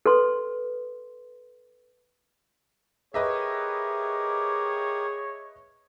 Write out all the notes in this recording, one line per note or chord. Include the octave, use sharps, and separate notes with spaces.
A4 B4 C6
G4 G#4 A#4 B4 C#5 D#5 E5